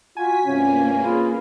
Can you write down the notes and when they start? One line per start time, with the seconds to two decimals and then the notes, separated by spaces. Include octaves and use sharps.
0.17 F4 F#4 G#5 B6
0.46 G2 C3 A#3 C#4 F4
1.03 F4 G#4 B4